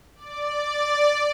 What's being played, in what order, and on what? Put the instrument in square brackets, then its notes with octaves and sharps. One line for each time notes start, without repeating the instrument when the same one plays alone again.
[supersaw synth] D5